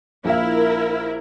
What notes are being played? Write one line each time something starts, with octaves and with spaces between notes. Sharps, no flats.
A#1 E4 A#4 F5